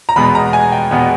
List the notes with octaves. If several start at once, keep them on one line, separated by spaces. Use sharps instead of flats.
A#5
E2 B2 G#3 B3 B5
A#5
G#5
G5
E2 B2 G#3 B3